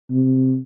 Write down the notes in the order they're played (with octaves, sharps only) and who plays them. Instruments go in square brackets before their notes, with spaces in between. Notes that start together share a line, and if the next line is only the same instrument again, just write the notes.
[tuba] C3